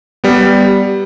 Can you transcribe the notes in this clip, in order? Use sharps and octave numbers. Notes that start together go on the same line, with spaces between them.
G3 B3